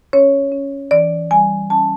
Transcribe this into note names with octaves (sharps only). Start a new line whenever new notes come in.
C#4 C#5
C#4
E3 D5
G3 G#5
C#4 A5